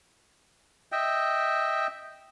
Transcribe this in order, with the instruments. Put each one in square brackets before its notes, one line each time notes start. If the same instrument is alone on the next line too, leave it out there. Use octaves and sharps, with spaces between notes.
[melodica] D#5 E5 G5